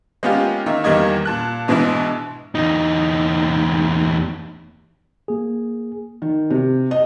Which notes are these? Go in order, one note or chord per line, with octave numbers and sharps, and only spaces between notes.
G#3 A#3 B3 C#4 F4 G4
D#3 A#3 D#4 E5
E2 D#3 G3 A#3 D#5 G#6
A#2 A5 F#6
G#2 B2 E3 G#3 D4 E4
E2 D#4
A#3 G#4
D#3
C3
D#5